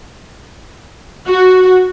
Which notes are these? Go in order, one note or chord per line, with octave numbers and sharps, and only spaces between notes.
F#4